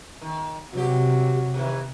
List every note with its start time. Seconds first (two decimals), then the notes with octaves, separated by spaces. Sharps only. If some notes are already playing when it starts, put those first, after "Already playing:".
0.22 D#3
0.73 G2 C3 F#3 G4
1.54 C3 D#3 E3